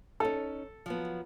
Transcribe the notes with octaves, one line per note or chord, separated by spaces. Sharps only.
C#4 D#4 A4
F3 F#3 B3